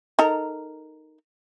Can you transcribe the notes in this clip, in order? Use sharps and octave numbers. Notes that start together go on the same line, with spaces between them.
D#4 A4 A#4